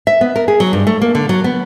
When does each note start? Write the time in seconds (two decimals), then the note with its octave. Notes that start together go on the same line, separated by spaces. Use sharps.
0.07 E5
0.21 B3
0.36 A#4
0.48 G#4
0.60 F#3
0.73 G2
0.87 A3
1.02 A#3
1.15 D3
1.29 F#3
1.44 B3